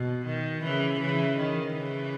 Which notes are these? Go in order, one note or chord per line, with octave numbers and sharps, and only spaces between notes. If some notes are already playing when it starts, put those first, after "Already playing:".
Already playing: B2
D#3
C#3 E3
C#3 E3
D#3
C#3 E3